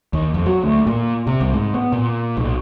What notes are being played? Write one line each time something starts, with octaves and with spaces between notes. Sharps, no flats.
D#2
F2
F#3
D2
A#2
C3
C2
G#2
B3
A#2
B1